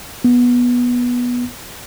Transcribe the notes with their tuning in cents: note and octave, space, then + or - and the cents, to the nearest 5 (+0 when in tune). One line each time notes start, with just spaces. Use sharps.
B3 -15